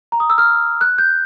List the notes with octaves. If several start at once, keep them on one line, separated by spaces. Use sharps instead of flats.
A#5
D#6
E6
F6
F#6
G6